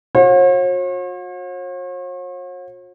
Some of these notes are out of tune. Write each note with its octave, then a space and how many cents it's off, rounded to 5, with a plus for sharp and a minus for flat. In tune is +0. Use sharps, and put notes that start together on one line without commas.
F#4 -45 C#5 -45